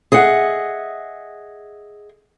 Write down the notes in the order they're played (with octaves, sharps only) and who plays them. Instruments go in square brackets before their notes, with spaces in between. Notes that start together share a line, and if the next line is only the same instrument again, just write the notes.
[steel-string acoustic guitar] G#4 D#5 E5 F#5